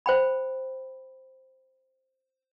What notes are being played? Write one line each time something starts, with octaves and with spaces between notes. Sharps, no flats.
C5 G5 B5